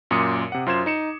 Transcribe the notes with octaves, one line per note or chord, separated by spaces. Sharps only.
F#2 A#2 C6 D6 D#6 C#7
C3 F#5
F#2 F4 C5 C6 G#6 E7
D#4 C#7 E7